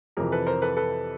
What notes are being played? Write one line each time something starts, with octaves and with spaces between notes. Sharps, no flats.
F2 C3 E3 G#4 A#4
A4 B4
A#4 C5
A4 B4
A4 B4